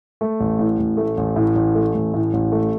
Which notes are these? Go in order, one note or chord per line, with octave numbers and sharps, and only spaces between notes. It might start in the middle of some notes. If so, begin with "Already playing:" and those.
A3
A1
A2
A1
A3
A1
A2
A1
A3
A1
A2
A1
A3